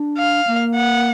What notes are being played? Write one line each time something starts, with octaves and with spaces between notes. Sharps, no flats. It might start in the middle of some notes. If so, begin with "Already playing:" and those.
Already playing: D4
F5
A#3
F#5